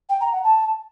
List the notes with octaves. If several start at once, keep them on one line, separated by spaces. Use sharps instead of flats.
G5
A#5
F#5
A5